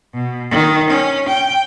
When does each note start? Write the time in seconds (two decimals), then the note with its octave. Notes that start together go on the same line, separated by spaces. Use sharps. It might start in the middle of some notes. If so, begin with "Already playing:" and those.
0.14 B2
0.51 D#3
0.90 C#4
1.29 G5